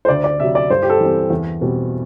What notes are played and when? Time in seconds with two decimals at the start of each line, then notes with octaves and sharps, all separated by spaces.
0.05 C5
0.08 D2 D5
0.24 D5
0.40 C3 F#3 E5
0.55 D5
0.70 G2 C5
0.83 G4
0.90 A4
1.00 E3 G3 C4
1.30 E2
1.61 B2 G3 C4